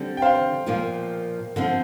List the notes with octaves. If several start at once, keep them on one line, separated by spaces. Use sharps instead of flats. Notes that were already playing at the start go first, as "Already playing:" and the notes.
Already playing: D3 G3 C4
G5
C5 F5
A#2 F3 A#3 F4
D3 F3 C4